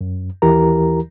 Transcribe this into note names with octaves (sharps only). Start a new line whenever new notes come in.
F#2
D#2 E3 E4 G4 A#4 A#5